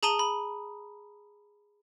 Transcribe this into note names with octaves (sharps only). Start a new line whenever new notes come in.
G#4 A5 A#5 D#6 D#7 G7
B5